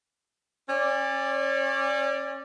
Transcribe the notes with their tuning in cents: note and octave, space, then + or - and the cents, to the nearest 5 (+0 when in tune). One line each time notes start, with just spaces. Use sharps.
C#4 -30 D5 +0